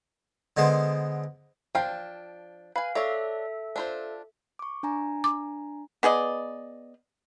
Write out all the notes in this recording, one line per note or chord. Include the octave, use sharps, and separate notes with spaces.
D3 G#3 B3 C5
F3 D4 F5 G5
B4 F5 G#5
D4 A4 C#5 D5 E5
D4 F4 C5
C#6 D6
D4 G#5 A#5
D6
B3 G#4 D5 D#5